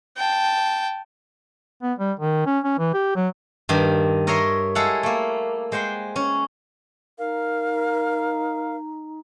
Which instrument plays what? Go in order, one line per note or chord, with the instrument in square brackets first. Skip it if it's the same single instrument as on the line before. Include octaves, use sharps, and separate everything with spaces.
[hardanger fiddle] G5 A5
[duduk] B3
G3
D#3
C#4
C#4
E3
G4
F#3
[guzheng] G2 D#3
A#4 C#5 D#5 E5 A#5 C6
G#3 E4 A4 F5 F#5
A3 A#3
G#3 C5 F#5 G5
C#4
[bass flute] D#4 [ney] A#4 [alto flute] F5